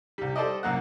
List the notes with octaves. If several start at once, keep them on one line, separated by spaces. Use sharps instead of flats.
C2 G3
G3 A4 C5 D5 D#5
C2 F#2 A#3 F#5